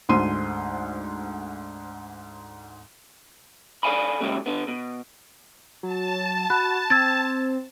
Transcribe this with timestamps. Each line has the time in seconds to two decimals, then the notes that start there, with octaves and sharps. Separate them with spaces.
0.09 D2 G#2 C5 C6 D#7
3.83 A4 D5 F5 G#5 B5
4.21 A#2 C#3 F#3 G#3 A3 G4
4.46 D3 B3
4.68 B2
5.83 F#3 A5
6.50 F#4 B5 F#6
6.90 C4 E6 G#6 A6